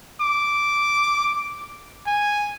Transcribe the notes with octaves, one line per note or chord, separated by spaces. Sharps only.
D6
G#5